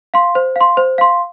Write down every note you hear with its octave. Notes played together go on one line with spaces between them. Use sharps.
F5 C6
C5
F5 C6
C5
F5 C6